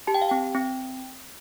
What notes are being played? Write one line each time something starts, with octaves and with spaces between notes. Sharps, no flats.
G4 A5
G5
F5
C4 G5
C4